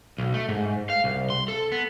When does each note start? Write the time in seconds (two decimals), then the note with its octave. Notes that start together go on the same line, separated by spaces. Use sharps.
0.18 B1
0.34 A3
0.49 G#2
0.90 F5
1.04 C2
1.30 C6
1.48 A4
1.72 B3